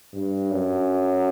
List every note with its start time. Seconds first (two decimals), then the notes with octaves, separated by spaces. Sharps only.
0.13 G2
0.51 F#2